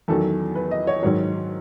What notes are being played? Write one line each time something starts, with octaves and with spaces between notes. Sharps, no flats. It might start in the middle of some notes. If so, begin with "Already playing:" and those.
E2 D#3 F#3 A4
B4
D#5
C#5
G#2 D#3 F#3 C#5